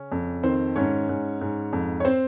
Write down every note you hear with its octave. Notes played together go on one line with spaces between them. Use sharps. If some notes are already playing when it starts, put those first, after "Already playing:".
Already playing: C#3 C#4
F2
D#3 C4 C5
G#2 C#4 C#5
G#2
G#2
F2
C#5
C4 C5